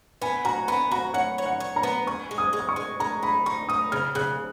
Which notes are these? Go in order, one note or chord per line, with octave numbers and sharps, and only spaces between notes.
B3 G#5
F#4 A#5
B3 B5
F#4 A#5
C#5 F#5
C#5
F#5
C#5
A#5
B3
G#4 C#6
G#3
D#6
G#3
D#6
C#6
G#3
G#3 A#5
D#4 B5
D#4 C#6
D#4 D#6
C#3 F6
C#3 F#6